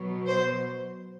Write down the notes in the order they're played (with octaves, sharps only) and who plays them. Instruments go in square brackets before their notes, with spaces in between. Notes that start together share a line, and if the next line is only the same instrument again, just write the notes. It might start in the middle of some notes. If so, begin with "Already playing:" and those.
Already playing: [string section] B2 F#3
C5